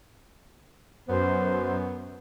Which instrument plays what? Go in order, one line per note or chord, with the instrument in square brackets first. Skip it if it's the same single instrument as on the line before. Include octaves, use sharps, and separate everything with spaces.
[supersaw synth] F#2 [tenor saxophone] B3 [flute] C5